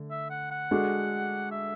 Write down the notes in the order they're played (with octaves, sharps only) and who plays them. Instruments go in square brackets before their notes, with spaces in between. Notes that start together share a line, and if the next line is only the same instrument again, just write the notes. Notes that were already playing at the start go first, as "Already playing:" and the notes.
Already playing: [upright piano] D3 A3
[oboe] E5
F#5
F#5
[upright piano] G#3 D4 F#4 A4
[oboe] E5